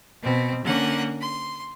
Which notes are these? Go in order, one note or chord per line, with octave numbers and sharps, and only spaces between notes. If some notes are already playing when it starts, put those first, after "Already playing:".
B2 C4
D3 A#3 C#4 F#5
C6